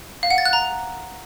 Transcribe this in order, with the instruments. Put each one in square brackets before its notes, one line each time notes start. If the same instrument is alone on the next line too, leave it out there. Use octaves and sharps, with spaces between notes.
[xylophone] F5
F#5
A6
F#6
A#5